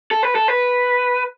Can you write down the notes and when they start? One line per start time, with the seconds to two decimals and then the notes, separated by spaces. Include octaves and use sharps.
0.11 A4
0.23 B4
0.35 A4
0.48 B4